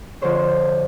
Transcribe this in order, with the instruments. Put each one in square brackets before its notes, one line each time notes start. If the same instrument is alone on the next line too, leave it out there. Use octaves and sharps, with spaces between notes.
[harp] F2 D3 G#4 C5 C#5